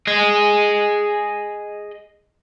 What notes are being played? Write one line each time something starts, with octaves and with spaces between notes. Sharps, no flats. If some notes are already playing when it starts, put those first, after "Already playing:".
G#4 D#5